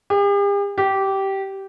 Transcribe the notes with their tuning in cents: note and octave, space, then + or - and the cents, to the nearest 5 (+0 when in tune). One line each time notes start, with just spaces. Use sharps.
G4 +45
G4 -15